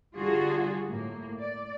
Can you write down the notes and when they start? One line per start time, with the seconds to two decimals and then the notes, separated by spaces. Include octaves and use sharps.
0.16 D3 G3 F4 F#4 G#4
0.88 A2 A#3
1.40 D5